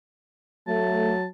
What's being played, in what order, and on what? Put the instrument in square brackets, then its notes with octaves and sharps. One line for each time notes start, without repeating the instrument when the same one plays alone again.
[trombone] F#3 [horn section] A3 [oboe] A5